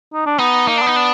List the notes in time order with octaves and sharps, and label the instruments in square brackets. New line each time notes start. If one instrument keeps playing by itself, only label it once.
[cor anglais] D#4
D4
[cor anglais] B3 [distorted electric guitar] D#4
[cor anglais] A#3 [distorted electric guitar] D#4
[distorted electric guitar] D4
[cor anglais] B3 [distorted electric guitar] D#4
[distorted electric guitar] D4